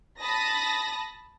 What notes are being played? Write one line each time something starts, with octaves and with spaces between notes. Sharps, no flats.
A5 B5 D#6 A#6